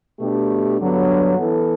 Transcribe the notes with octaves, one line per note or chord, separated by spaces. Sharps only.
B2 A3 D4 G4
G2 D3 F#3 B3
E3 B3 E4 A4